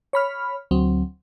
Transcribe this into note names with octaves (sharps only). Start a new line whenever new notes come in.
C#5 B5 F6
D2 F#3 C4